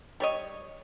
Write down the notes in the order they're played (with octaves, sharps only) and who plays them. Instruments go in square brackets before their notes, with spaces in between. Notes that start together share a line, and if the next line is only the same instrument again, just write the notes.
[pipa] G3 C#5 D#5